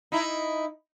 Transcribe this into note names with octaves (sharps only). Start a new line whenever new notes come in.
D#4 E4